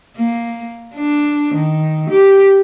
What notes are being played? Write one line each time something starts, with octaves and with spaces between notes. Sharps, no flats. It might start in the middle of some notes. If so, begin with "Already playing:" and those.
A#3
D4
D#3
G4